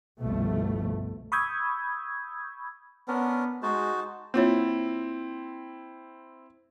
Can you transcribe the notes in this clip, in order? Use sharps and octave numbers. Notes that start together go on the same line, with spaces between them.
G1 C2 B2 F3 A3
B5 C#6 D#6 E6 G6 G#6
B3 C#4 D4 A#4
G#3 D#4 F#4 C5 A5
A#3 C4 E4 F4 C#5